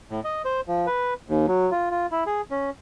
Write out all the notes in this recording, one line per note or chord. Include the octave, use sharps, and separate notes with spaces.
A2
D#5
C5
F3
B4
D#2
F#3
F4
F4
E4
G#4
C#4